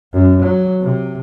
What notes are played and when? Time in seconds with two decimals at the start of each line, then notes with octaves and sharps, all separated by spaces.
0.14 F#2
0.43 F#3
0.82 C3